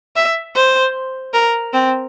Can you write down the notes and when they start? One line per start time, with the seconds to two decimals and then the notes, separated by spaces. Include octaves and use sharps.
0.16 E5
0.55 C5
1.34 A#4
1.73 C4